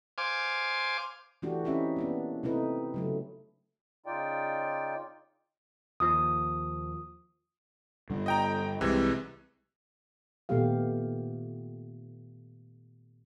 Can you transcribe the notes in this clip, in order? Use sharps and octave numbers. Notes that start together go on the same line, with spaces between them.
C5 F5 G#5 D6
E3 A3 D4 F#4 G4
C4 C#4 D#4 E4 G4 E5
A#3 B3 D4
C3 A3 C4 D#4 E4 B4
C#3 F#3 A3
C#3 D#4 F4 D5 G5
D#2 F3 A#3 D#6
G2 D3
D#5 G5 A#5
C2 C3 E3 G#3
A#2 D#3 A3 B3 G4 F5